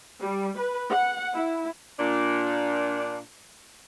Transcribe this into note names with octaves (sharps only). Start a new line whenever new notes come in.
G3
B4
F#5
E4
A#2 D4